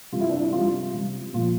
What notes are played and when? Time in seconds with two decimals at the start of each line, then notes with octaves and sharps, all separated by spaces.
0.12 C3 G3 F4
0.20 E4
0.29 D4
0.38 E4
0.53 C3 G3 F4
0.94 C3 G3
1.34 A#2 F4
1.37 F3